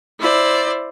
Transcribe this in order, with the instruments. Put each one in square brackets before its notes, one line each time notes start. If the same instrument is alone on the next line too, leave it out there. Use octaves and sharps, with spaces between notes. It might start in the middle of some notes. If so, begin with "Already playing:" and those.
[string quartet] E4 C5 D5